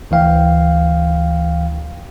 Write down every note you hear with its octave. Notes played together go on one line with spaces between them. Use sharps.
D2 E3 F5 G5